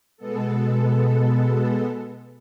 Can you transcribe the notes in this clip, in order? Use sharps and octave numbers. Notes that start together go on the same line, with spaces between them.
B2 G#3 B3 A4